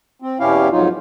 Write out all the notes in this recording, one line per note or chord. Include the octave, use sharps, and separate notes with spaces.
C4
E2 B2 C#4 E4 G4 F5
F2 G#2 F#3 D#4 F4